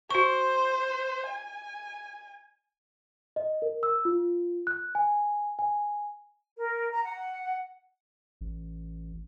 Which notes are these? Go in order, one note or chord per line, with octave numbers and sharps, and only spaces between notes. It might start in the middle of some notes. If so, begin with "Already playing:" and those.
F#4 C5 C#6
G#5
D#5
A#4
E6
F4
F#6
G#5
G#5
A#4
A#5
F#5
A1